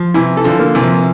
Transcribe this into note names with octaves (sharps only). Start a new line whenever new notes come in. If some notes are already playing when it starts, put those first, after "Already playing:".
Already playing: F3
C3 E3 E4
A4
D3 F3
A#3
C3 E3
F3